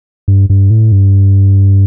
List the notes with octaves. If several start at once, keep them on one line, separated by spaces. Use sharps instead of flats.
G2
G2
A2
G2